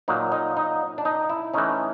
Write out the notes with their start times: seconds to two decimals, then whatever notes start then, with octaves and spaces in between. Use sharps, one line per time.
0.08 A#2 F#3 A#3 D#4
0.32 D#4
0.57 D#4
0.98 D4
1.05 D#4
1.30 E4
1.54 E3 A3 C#4 D#4